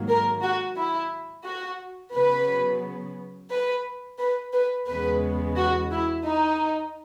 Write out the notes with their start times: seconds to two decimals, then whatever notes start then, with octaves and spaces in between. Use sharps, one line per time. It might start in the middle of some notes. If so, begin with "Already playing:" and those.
Already playing: G#2 D#3 F#3 A#3
0.08 A#4
0.42 F#4
0.76 E4
1.45 F#4
2.13 C#3 F#3 B3 B4
3.50 B4
4.19 B4
4.53 B4
4.87 E2 C#3 G#3 B3 B4
5.56 F#4
5.90 E4
6.24 D#4